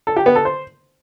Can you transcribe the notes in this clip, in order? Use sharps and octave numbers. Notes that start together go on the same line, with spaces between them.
A4
G4
B3
A4
C5